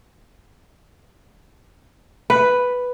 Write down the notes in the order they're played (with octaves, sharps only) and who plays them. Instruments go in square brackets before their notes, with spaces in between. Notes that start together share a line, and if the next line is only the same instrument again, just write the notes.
[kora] B4